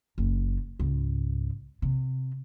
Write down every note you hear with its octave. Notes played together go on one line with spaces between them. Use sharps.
F#1
C#2 G#2
C3